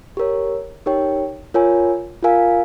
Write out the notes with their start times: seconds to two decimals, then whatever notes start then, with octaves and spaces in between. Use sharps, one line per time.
0.17 G4 A#4 C#5
0.86 D#4 G4 A#4 C#5 G5
1.54 F4 A#4 C#5 G#5
2.23 F4 A#4 F5 G#5